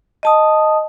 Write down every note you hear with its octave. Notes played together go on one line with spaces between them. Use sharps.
D#5 A5 D#6